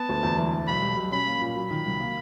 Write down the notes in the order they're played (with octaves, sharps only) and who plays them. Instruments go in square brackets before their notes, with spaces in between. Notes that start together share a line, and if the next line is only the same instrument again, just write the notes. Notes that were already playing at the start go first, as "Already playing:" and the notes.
Already playing: [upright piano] B3 [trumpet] A5
[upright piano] D2
E2
E3
E2
[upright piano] B1 [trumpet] B5
[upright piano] G3
B1
[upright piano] C#4 [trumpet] B5
[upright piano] A#3
A#2
[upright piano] F#3 [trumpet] B5
[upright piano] D#3
C2
A#3